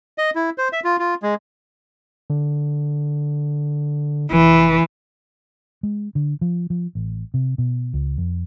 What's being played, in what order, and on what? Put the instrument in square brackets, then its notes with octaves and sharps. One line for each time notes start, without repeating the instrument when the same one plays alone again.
[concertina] D#5
E4
C5
E5
F4
F4
G#3
[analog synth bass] D3
[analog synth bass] F1 [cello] E3
[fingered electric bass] G#3
D3
F3
F3
A1
C3
B2
C#2
F2